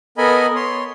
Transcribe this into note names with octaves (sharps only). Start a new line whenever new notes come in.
B3 A4 A#4 D#5 G#5 B5
C#5 C6